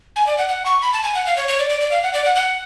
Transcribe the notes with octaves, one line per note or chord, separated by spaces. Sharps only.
G#5
D5
F#5
F#5
C#6
B5
A5
G#5
F#5
F5
C#5
C#5
D5
D5
D5
F5
F#5
D5
F#5
F#5